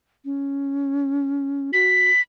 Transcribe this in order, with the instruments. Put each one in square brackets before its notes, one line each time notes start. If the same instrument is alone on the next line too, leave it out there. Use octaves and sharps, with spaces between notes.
[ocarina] C#4
[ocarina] F#4 [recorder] B6